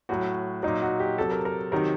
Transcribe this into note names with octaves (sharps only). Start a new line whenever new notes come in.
A2 F#3 F#4
A#2 F#3 D#4
F#4
G4
C3 F#3 A4
A#4
A#4
C3 D#3 F#3 A#4